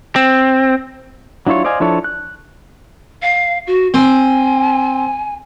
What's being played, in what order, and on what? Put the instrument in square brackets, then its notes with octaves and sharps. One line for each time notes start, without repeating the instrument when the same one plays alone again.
[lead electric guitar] C4
[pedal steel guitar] F#3 D4 E4 F4 C#5
C5 D5 D#5 F5 G#5
F3 D4 E4 A4 C#5
F#6
[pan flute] F5
F#4
[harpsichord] C4 [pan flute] G#5